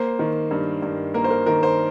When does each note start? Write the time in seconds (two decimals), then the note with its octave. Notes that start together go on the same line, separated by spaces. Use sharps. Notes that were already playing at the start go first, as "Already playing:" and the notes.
Already playing: A#3 C5
0.19 D#3
0.51 G2
0.82 G2
1.14 A#3 A#4
1.24 C5
1.31 A#4
1.46 D#3 A#4
1.63 C5